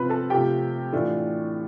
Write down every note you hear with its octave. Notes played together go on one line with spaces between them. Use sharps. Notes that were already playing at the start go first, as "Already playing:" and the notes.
Already playing: C3 F3 C4 F4 B4 B5
A4 A5
C3 F3 A3 C4 F4 G4 G5
A2 E3 A3 D4 F4